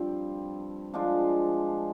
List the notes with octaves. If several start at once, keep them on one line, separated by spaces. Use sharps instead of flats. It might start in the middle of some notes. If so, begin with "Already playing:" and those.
Already playing: G2 F3 C4 F4
F3 G#3 D4 F4